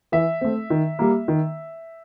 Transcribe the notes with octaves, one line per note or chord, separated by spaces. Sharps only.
E3 E5
A3 C4
D#3
G3 A#3
D#3